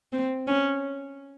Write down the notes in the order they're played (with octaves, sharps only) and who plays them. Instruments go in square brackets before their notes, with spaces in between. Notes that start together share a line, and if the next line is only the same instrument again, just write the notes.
[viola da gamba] C4
C#4